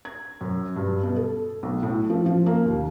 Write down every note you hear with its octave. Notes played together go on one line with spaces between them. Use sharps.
G#6
F#2
G2
B2
A4
B1
A2
F3
F3
A#3
D#2